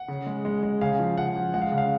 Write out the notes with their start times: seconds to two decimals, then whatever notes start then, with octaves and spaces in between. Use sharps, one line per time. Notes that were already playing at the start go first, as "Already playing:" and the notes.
Already playing: F#5
0.08 C#3
0.26 G#3
0.45 G#3
0.63 G#3
0.81 C#3 F5 G#5
0.99 F3
1.18 C#3 F#5
1.36 F3
1.54 G#3 F#5
1.62 F5
1.72 C#3
1.78 F5